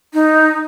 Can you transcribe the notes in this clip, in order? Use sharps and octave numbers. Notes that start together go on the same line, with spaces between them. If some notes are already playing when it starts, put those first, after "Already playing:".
D#4